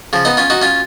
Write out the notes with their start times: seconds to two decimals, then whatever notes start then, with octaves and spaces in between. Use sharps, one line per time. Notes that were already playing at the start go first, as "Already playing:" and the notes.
0.13 C#3 F3
0.25 B3 D#4
0.37 C#4 F4
0.50 D#4 F#4
0.62 C#4 F4